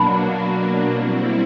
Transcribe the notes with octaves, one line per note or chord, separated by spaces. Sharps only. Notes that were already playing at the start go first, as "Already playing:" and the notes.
Already playing: B2 F#3 A#3 D4 F#4 A5 B5
G3 C4 E4